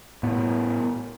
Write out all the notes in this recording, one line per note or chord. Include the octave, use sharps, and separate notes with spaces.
A2 B3